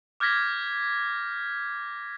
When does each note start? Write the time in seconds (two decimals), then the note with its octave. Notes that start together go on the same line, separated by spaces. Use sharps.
0.20 D6 F6 G6 G#6 A#6 B6